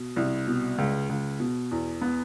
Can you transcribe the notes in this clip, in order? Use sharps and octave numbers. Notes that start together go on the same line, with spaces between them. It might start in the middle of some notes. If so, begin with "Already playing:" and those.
Already playing: B2
C2
B2
C#2
C#2
B2
E2
B3